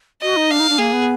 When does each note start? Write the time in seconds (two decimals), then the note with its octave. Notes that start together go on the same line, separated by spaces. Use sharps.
0.22 F#4 D#5
0.36 D#4
0.50 D4 F5
0.60 D#4
0.69 D4
0.78 A#3 G#4
0.93 B3